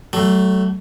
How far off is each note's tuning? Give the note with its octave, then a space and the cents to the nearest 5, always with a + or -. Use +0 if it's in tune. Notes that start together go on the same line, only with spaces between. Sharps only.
F#3 +35 A3 +0